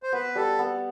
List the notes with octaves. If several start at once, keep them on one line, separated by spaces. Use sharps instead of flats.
C5
B3 B4
G3 A4
B3